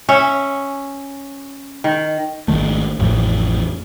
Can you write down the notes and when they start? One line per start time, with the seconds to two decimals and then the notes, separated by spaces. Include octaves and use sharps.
0.09 C#4 C#5 E5
1.84 D#3
2.48 G#1 D#2 D#3 A3
2.99 A1 F2 A2 E3